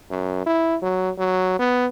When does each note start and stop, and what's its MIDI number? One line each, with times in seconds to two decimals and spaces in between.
0.10 0.42 42
0.46 0.76 64
0.82 1.11 54
1.18 1.57 54
1.59 1.87 59